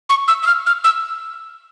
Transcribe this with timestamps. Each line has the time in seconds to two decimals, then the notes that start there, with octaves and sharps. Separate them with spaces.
0.09 C#6
0.28 E6
0.43 E6
0.47 F6
0.66 F6
0.84 E6